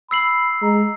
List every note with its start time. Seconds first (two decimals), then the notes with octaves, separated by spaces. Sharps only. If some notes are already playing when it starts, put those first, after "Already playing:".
0.11 B5 E6 C7 F#7
0.62 G#3 A#5